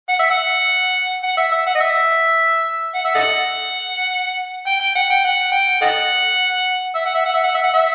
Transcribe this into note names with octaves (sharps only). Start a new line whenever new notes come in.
F#5
E5
F#5
F#5
E5
E5
F#5
D#5
E5
F#5
E5
A4 D#5 F#5
G5
G5
F#5
G5
F#5
G5
A4 D#5 F#5
E5
F#5
E5
F#5
E5
F#5
E5
F#5
E5